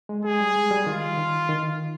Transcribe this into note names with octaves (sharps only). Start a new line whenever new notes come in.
G#3
G#3 G#4
G3
G#3
G3
D#3 F4
D#3
D#3